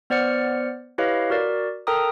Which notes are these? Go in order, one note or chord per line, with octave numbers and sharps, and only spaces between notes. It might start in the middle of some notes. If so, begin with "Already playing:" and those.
B3 C5 D5 F#5 F6 C#7
E4 G4 B4 C#5 D#5 F5
F#4 A#4 D5
A4 A#4 G5 A#5 D#6